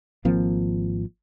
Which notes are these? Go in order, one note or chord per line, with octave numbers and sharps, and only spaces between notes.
G#1 F3 A#3 C4